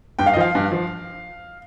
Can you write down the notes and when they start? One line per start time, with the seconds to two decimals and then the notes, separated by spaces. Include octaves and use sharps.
0.19 G2 G5
0.26 F5
0.34 D#5
0.37 F3 F5
0.55 G2
0.72 F3